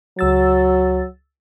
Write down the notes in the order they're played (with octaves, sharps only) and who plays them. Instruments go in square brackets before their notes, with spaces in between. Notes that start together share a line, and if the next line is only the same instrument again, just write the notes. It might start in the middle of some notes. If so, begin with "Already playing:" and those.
[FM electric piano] C#2 E6 A6 [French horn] F#3